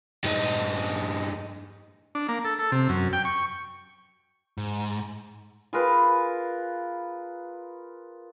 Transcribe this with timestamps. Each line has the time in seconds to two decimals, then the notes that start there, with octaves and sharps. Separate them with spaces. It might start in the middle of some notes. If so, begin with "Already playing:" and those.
0.24 G2 D#4
2.15 D4
2.29 A#3
2.45 A4
2.59 A4
2.72 C3
2.89 F#2
3.13 G5
3.25 C#6
4.58 G#2
5.73 F4 G#4 A#4 B4